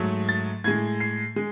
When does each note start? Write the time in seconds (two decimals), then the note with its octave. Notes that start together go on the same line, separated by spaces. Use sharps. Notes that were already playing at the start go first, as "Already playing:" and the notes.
Already playing: G#2 F#3 A3
0.29 A6
0.64 A2 G#3 G#6
1.00 C7
1.36 G#3